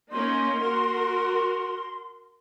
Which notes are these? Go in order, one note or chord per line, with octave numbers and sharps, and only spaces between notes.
A#3 C#4 D#4 C6
F#4 A#4